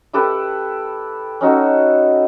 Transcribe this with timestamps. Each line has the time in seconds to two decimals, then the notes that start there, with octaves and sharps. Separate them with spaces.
0.13 E4 G4 A4 B4
1.41 C#4 D#4 F#4 A4